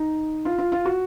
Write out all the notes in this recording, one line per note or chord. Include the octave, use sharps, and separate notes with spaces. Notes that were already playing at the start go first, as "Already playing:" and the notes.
Already playing: D#4
F4
F4
F4
F#4